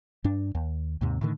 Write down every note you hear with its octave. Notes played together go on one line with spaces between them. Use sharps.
G2 D4
D#2
D#2 G#2 C3
A2 D3 D#3